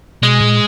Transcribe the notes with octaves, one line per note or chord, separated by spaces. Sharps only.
B2 G#3
A#2